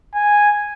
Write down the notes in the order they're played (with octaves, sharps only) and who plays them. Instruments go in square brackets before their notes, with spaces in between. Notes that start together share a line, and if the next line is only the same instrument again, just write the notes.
[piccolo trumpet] G#5